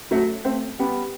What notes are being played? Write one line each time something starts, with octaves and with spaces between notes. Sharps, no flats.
F#3 A3
A3 C4
G3 B3